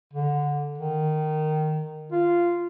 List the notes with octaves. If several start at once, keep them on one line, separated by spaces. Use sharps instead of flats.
D3
D#3
F4